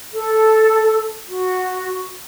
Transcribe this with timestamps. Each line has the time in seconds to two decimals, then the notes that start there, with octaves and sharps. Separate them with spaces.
0.12 A4
1.29 F#4